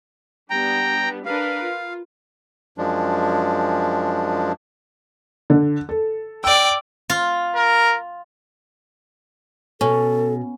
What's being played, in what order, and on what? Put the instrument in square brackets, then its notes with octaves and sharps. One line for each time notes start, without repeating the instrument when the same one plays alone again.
[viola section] G3 B3 D4 [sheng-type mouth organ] G5 A#5
[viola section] D4 A#4 B4 [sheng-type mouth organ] F5
[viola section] F4
[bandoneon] F#2 F3 G#3 D4
[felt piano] D3
A4
[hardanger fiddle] D5 G5 [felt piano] E6
[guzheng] F4
[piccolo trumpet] A#4
[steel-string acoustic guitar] B2 [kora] C#4 [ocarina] A4